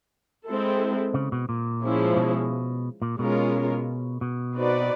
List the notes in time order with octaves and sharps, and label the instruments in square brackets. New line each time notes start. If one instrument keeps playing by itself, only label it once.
[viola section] G#3 C4 E4 A4
[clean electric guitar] C#3
B2
A#2
[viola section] F3 G#3 C#4 E4
[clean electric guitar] B2
A#2
[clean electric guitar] B2 [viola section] G#3 C#4 F4 A#4
[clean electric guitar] B2
[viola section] C4 D#4 F#4 B4 D5